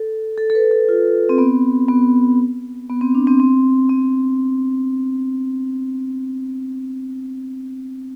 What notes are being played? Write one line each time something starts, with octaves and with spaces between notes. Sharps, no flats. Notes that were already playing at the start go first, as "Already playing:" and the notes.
Already playing: A4
A4
A4
B4
A4
F4
C4
B3
B3
B3
C4
D4
C4
C4
C4